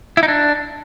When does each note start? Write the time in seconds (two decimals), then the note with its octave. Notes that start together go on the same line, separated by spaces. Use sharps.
0.17 E4
0.23 D#4
0.28 D4